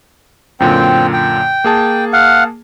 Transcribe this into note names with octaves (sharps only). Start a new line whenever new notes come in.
F#2 A#2 D3 C4 G5
G5
A#3 G#4 A5
F5 F#5